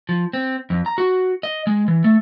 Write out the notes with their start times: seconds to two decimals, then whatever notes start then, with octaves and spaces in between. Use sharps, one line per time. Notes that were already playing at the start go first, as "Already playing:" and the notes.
0.09 F3
0.33 C4
0.70 F2
0.86 A#5
0.98 F#4
1.43 D#5
1.67 G#3
1.88 E3
2.04 A3